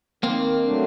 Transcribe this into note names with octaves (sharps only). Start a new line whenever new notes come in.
D#3 A#3 C4
F#3 A3 D4